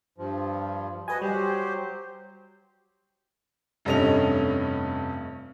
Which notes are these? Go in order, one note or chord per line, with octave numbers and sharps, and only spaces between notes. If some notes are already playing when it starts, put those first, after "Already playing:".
G2 F3
F#4 B4 D#5 G#5
F#3 G3 G4 C5
F1 G2 A3 C#4 D#5 F7